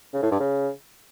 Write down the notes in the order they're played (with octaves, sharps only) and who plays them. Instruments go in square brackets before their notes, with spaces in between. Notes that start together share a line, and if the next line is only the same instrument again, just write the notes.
[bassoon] C#3
A2
G2
C#3